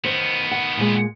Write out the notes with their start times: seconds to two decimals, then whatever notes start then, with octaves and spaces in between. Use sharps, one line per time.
0.04 D#3 B3 C5
0.51 F#5
0.77 A#2 G#3